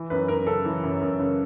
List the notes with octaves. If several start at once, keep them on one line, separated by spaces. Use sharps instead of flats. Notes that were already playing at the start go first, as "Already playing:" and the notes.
Already playing: E3
F#2 B4
F#2 A#4
C#3 A4
E3
F#2
F#2
C#3